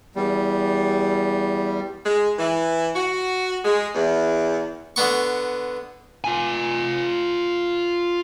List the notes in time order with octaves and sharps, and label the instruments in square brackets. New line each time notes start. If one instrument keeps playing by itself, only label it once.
[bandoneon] E2 G3
[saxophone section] G#3
E3
F#4
G#3
E2
[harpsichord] D3 B3 C#6
[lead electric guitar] F4 G#5